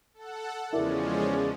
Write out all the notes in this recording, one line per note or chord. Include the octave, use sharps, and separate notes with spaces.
A4 F#5
E2 C#3 F3 G#3 C#4 E4 A#4 D5